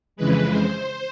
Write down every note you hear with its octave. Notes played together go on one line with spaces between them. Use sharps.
F2 C#3 E3 G#3 B4
C5